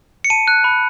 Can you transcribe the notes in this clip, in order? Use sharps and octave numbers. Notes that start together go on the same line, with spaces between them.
C#7
A5 D#7
F#6
B5